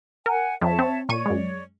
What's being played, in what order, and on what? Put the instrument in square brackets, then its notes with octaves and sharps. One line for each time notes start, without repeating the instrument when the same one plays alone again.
[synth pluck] A#4 [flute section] F#5 G#5
[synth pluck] F2 [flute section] C#5 E5 A5
[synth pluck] C4
[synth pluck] A#2 C#6 D#7 [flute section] C#5 D5
[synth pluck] F#2 G#3